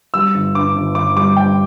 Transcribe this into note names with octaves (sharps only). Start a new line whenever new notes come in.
G3 E6
G1
G2 D6
G1
G1 D6
G3 D6
G3 G5